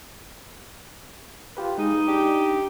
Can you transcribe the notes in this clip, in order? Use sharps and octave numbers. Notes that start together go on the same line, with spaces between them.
F4 G4 B4
G#3 D#4
D4 G4